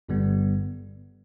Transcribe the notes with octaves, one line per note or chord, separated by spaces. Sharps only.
G1 G2 D3 G3 B3